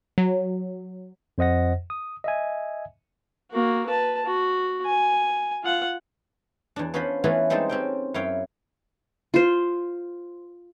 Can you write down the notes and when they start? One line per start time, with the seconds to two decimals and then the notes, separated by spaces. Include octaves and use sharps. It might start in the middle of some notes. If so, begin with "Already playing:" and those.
0.18 F#3
1.38 F2 C5 D#5 F#5 A#6
1.90 D#6
2.24 D#5 E5 G#5
3.52 A#3 F#4
3.86 B4 A5
4.26 F#4
4.86 G#5
5.63 F4 F#5
6.76 E2 D4
6.94 B3 C#4 F4 C5 B5
7.24 E3 A3 B3 C#4 E4 F4
7.50 G3 G#3 C4 D#4 A4
7.69 C4 C#4 G5
8.14 F#2 E4 C#5 F5 G5
9.34 F4 C5